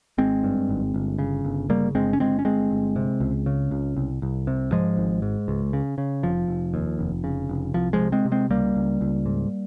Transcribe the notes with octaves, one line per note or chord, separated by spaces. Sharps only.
G#1 G#3 C4
G2
G#1
G1
C#3
G1
C#3 G3 A#3
G1 G#3 C4
C#4
G1 G#3 C4
C#4
G1 G#3 C4
G1
C3
C#2
C#3
C#2
C2
C2
C3
G#2 F3 G#3
G#1
G#2
C#2
C#3
C#3
F1 F3
F1
D#2
F1
C#3
F1
C2 F3
F3 G#3
C3
G#3 C4
C3
G#3 C4
C#2 G3 A#3
C#2
C#2
G#2